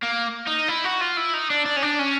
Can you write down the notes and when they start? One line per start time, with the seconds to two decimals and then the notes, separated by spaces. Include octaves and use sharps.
0.03 A#3
0.47 D#4
0.68 E4
0.84 F#4
1.00 F4
1.17 E4
1.33 D#4
1.50 D4
1.66 D4
1.76 C#4
1.83 D4
1.99 C#4